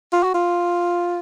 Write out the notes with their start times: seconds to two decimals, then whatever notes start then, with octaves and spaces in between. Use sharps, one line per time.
0.13 F4
0.23 F#4
0.34 F4